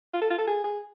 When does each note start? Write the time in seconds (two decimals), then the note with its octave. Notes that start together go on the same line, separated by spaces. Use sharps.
0.14 F4
0.22 A4
0.30 F4
0.39 A4
0.47 G#4
0.64 G#4